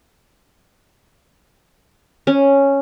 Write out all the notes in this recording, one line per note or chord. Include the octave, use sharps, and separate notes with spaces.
C#4